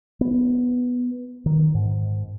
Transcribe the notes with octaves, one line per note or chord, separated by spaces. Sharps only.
B3
D#3
G#2